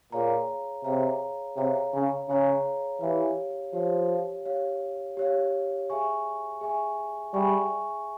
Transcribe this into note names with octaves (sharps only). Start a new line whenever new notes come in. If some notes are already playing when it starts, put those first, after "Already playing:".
A#2 G#4 C#5 F5 A#5
C3 G#4 C#5 F5 A#5
C3 G#4 C#5 F5 A#5
C#3
C#3 G#4 C#5 F5 A#5
E3 G4 C#5 F5
F3 G4 C#5 F5
G4 C#5 F5
G4 C#5 F5
G#4 E5 G#5 C#6
G#4 E5 G#5 C#6
G3 G#4 E5 G#5 C#6